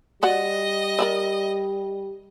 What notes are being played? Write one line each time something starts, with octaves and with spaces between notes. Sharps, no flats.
G3 F#4 D5 D#5 F#5
A#4 D5 E5